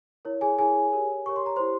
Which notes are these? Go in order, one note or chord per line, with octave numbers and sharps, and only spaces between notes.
E4 A#4 C#5
G#4 G#5
E4 G#4 A#4 C#5 G#5
G4 A#4 C#5
G4 A#4 C#5 C#6
C6
A#5
E4 G4 C5 C6